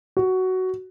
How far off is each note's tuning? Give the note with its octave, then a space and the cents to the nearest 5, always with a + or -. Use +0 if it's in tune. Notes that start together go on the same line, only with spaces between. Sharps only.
F#4 +10